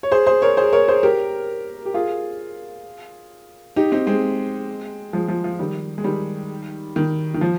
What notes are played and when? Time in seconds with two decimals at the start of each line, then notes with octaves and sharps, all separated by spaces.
0.03 C#5
0.11 G#4 C5
0.26 G#4 C5
0.42 A#4 C#5
0.57 G#4 C5
0.72 A#4 C#5
0.88 G#4 C5
1.03 G4 A#4
1.85 G4
1.94 F4 G#4
3.76 D#4 G4
3.92 C4 D#4
4.07 G#3 C4
5.13 F3 G#3
5.28 F3
5.44 F3
5.59 D#3 G3
5.98 G#3
6.04 D#3 G3
6.96 D#3
7.34 D#3
7.41 F3